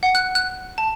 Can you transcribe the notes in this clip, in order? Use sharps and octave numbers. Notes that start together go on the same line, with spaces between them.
F#5
F#6
F#6
A5